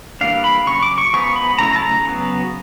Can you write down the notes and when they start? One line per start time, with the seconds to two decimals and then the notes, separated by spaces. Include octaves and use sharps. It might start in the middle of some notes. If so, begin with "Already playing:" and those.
0.21 E3 G3 A#3 D4 F5
0.44 B5
0.66 C#3 F#3 C#6
0.82 D6
0.98 C#6
1.13 F3 G#3 B3 D#4 C#6
1.36 B5
1.59 C#3 F#3 A3 C#4 E4 A#5
1.76 A5
1.82 A#5
2.05 C#3 F#3 B3